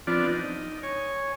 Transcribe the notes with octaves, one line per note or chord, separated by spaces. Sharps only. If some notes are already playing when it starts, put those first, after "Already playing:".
F3 B3 C4 D4 F4 D5
D#4
C#5 G#5